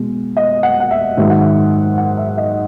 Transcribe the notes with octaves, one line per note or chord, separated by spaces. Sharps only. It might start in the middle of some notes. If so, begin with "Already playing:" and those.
Already playing: B2 G#3
D#5
F#5
F#5
E5
G#2 D#3 F#3 E5
F#5
E5
F#5
E5
E5
D#5